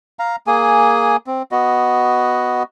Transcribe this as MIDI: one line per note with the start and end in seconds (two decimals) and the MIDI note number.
0.19 0.36 77
0.19 0.36 82
0.47 1.17 58
0.47 1.17 68
0.47 1.17 80
1.27 1.42 60
1.52 2.63 59
1.52 2.63 66
1.52 2.63 75